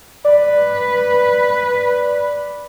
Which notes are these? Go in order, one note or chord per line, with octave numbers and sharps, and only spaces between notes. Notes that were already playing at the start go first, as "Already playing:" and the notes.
B4 D5